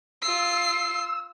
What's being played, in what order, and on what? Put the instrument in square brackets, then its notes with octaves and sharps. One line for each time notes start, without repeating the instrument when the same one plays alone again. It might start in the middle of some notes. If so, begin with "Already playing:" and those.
[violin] F4 C7 [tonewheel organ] E6